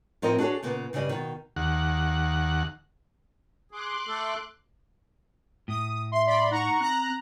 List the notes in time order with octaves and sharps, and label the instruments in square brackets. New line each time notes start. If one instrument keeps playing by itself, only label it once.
[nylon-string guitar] A2 F3 C4 D#4 A#4 D#5
D4 F#4 G#4 A4 C#5
A#2 C#3 A#3 B3
G2 C#3 G3 D5 D#5
B2 D#3
[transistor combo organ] D#2 F#5
[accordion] G#4 [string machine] C6 D6 F#6
[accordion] A3 A4
[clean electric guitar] A2 [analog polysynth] D#6
[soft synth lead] E5 [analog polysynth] C6
[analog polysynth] D5 B5 C6
[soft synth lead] D#4 [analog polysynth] F#5 A#5 C#6
[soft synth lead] C4 [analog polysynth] A#5 F#6